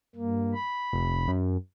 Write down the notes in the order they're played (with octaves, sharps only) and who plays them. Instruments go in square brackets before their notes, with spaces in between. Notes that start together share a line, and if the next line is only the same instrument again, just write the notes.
[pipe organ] G2 A#3
B5
[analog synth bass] F1
F#2